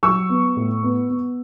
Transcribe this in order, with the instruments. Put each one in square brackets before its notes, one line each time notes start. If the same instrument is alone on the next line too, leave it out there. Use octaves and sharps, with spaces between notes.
[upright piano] F#3 C#6 E6
B3
A2
B3
B3